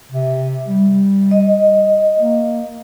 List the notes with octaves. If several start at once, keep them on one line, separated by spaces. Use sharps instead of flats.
C3
G3
D#5
A#3